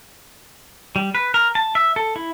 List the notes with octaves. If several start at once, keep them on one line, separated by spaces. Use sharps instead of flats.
G3
B4
A#4
A5
E5
A4
E4